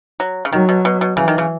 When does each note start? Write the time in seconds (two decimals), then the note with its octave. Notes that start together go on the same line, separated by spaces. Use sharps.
0.20 F#3
0.45 C#3
0.52 D#3 F#3
0.69 B2
0.85 B2
1.01 B2
1.17 C#3 E3
1.28 D#3
1.38 C#3